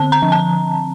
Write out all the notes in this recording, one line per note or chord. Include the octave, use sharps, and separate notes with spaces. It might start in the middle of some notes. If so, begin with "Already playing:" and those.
Already playing: D3 C4 A5
A#5
F3
A5